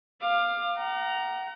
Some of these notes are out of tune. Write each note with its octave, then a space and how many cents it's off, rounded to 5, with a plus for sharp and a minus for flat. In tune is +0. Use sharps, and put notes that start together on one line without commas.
F5 +0 D6 +30
F#5 +45 A#5 +0